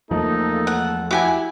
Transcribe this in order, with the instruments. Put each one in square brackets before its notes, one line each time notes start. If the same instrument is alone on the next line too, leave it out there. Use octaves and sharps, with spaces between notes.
[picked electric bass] E2 F3 A3 [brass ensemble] A#3 A4 [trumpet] D#4
[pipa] F#5
[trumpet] E4 [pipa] F#4 G4 G#5